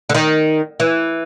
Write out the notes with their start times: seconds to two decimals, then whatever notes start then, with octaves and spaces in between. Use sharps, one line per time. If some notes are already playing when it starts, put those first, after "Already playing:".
0.09 D3
0.14 D#3
0.80 E3